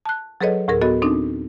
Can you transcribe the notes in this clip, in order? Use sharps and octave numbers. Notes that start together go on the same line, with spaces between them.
A5 F#6
F#3 G#4 A4 B4 C#5 D#5
D2 A2 G#4 A#4
B3 F#4 A4 D#5
C4 D4 D#4